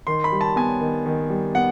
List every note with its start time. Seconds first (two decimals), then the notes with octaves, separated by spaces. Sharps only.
0.07 D#3 C6
0.24 B5
0.32 G3
0.41 A5
0.56 B3 G#5
0.81 D#3
1.06 D#3
1.30 G3
1.55 B3 F#5